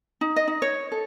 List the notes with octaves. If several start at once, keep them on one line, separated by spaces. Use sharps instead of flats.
D#4
D#5
D#4
C#5
A4